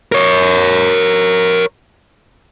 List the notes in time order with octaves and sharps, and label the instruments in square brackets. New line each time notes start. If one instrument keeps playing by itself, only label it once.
[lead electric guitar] A#4 C#5